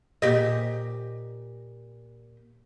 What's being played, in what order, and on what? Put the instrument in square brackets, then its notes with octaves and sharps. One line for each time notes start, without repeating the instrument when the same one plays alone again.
[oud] A#2 G4 D#5